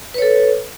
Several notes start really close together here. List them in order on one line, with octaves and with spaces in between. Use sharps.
B4 C#5 A4